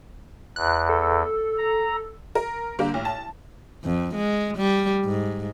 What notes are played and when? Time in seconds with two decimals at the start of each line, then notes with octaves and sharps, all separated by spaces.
0.56 E2 F#6
0.89 A4
1.58 A#5
2.35 A#4
2.79 D3 G3 A#3 G4
2.94 A1
3.05 A5
3.84 F2
4.15 G#3
4.57 G3
5.05 G#2